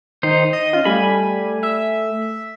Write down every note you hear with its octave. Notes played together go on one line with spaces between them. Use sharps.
D#3 D#4 C5
D#5 D#6
C#4 F4
G3 A3 G#5 B5
E5